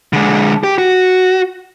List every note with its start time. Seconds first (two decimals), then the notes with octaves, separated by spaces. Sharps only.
0.13 D3 G#3
0.64 G4
0.78 F#4